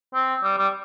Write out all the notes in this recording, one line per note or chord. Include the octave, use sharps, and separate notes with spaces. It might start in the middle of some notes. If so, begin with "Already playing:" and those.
C4
G3
G3